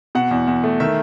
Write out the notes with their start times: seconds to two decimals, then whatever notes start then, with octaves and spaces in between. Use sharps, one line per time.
0.15 B2 F#5
0.31 E2
0.47 E2
0.64 A3
0.80 D#3 E5